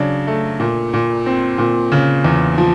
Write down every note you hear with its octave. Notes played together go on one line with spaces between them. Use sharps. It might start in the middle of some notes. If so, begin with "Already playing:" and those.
Already playing: C#3 F#3 D4
A3
A#2
A#2
C4
A#2
C#3
E2
F3